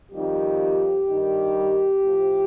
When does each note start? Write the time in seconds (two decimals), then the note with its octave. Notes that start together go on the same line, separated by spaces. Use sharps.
0.12 F2 D#3 G3 G4
1.07 G2 D#3 G3
2.01 A2 F3